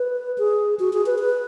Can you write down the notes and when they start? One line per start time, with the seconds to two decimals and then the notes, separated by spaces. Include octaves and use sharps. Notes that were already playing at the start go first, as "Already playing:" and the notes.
Already playing: B4
0.38 G#4
0.80 F#4
0.93 G#4
1.06 B4
1.19 B4